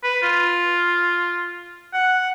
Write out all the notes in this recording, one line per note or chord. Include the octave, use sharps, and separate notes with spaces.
B4
F4
F#5